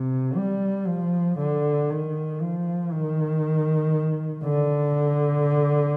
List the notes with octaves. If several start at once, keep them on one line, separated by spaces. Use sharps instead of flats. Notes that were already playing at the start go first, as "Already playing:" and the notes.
Already playing: C3
G3
F3
D3
D#3
F3
D#3
D3